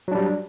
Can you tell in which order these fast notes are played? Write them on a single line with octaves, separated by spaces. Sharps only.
F#3 D4 G3